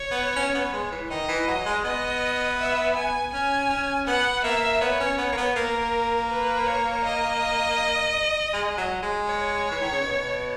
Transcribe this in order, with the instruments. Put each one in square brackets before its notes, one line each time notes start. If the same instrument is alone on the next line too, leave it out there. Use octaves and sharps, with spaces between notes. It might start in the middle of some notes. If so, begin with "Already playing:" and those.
Already playing: [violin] C#5
[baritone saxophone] B3
C#4
B3
G#3
E3
[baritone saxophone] D#3 [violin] D#5
[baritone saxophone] E3
F#3
G#3
[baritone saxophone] B3 [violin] D#5
[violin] E5
G#5
[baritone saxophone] C#4 [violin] G#5
[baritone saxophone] C#4
[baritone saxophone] B3 [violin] F#5
[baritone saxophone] A#3 [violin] E5
[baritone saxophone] B3 [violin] C#5
[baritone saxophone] C#4
B3
A#3
B3
[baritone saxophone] A#3 [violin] A#4
[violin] B4
C#5
D#5
[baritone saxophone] G#3
F#3
G#3
[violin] C#5
[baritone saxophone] E3
D#3
C#3
B2